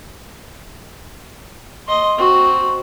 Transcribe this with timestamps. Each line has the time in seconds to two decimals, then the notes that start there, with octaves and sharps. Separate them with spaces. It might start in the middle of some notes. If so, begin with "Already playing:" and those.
1.87 D#5 C6
2.18 C4 F#4